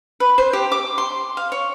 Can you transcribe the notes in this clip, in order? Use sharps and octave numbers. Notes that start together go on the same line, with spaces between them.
B4
C5
G4
D6
C6
F5
C#5